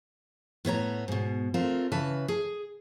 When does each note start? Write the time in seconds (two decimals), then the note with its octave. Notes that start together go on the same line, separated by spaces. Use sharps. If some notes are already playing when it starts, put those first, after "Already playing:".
0.65 A2 B3 C#5 A#5
1.08 G#2 B2
1.54 A3 C4 F4 A#4
1.92 C#3 E3 B4 A5
2.28 G#4